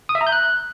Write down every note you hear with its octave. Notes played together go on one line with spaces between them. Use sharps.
D#6
E5
A#5
G6
F#6